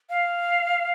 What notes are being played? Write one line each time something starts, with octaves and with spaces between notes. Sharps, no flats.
F5